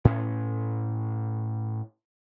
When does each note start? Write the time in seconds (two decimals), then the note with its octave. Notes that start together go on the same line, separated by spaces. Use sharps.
0.05 A2 C#4